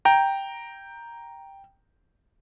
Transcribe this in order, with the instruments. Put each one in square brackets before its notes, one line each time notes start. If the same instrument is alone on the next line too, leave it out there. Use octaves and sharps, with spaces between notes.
[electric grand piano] G5 A#5